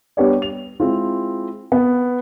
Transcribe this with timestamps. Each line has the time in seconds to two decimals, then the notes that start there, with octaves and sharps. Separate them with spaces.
0.17 G3 B3 D4 G4 C#5 D5
0.42 F7
0.80 G#3 C4 E4 F4
1.72 B3